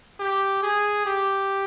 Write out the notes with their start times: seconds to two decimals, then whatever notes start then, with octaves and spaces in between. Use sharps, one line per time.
0.19 G4
0.63 G#4
1.06 G4